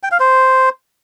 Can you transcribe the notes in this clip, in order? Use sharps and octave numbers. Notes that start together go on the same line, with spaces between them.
G5
F5
C5